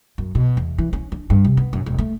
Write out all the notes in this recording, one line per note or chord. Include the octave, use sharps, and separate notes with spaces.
F#2
B2
E2
E3
C#4
D4
G2
C3
B3
F#2
E1
A3